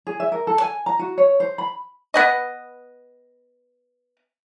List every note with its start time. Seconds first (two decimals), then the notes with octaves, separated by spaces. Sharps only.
0.07 G#4
0.20 E5
0.32 A#4
0.47 A4
0.62 G#5
0.86 A#5
0.99 F#4
1.18 C#5
1.40 C5
1.58 B5
2.14 B3 B4 D#5